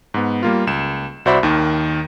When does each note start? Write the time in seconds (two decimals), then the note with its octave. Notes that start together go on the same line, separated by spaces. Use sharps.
0.14 G#2 B3
0.43 G3 A#3 F4
0.67 C#2 E7
1.25 C2 F#4 C5 D5 E5 B5
1.43 D#2 D#3